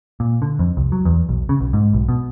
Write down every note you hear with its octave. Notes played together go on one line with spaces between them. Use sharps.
A#2
D3
F2
C2
F#3
E2
B1
C#3
B1
G#2
B1
B2